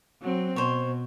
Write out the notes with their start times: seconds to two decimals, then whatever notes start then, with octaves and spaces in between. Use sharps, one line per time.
0.22 F#3 C4
0.56 B2 C5 C#5